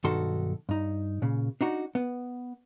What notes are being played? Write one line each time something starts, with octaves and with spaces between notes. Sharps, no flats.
B1 G2 D#3 F#4 A4 C6
G2 D#4
A#2 C#3
D4 D#4 F#4
B3